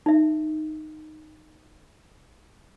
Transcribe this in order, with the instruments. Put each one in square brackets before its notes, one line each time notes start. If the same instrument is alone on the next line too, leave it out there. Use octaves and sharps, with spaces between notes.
[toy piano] D#4 E5